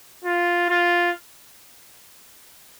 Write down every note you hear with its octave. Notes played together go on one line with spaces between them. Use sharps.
F4
F4